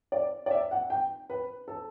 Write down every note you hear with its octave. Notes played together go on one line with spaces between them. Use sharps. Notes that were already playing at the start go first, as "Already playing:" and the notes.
D5
D5
E5
F#5
G5
B4
A4